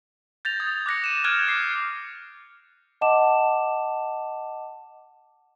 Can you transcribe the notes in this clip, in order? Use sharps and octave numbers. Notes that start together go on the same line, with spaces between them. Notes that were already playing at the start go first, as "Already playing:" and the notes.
G6 A6 A#6 F7
D#6 G#6
D6 F#6 A#6 C#7
D#7 E7
F6 F#6 G#6 D7 F7
D6 C7
D#5 F#5 A5 D6 E7